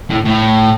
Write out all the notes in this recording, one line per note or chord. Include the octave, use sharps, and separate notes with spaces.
A2
A2